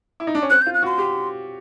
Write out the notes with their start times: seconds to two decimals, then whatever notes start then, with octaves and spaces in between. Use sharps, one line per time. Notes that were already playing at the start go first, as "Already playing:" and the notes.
0.20 E4
0.27 D#4
0.35 D4
0.42 C#4
0.50 C4 F#6
0.62 G6
0.66 F4
0.74 F#6
0.82 F#4
0.86 C6
0.98 G4